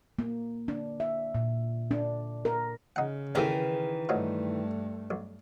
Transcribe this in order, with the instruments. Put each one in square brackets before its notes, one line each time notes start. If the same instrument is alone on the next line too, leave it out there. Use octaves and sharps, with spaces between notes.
[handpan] A#3
D4
E5
A#2
D4
A#4
[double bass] C#3 [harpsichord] D#4 F#5
[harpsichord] D#2 C3 A3 [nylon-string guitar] D#3 E3 G#4
[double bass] G2 A3 [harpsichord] F3 F#3 D#4
[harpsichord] B1